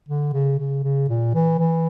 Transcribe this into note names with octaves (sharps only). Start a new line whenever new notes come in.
D3
C#3
C#3
C#3
A#2
E3
E3